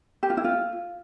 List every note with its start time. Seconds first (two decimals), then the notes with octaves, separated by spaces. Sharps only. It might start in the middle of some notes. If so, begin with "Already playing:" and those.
0.23 G4
0.30 F4
0.37 E4
0.44 F4